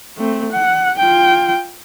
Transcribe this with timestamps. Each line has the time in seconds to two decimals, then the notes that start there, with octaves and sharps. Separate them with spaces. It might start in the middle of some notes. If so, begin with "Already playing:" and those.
0.18 A3 C4
0.52 F#5
0.98 F4 G5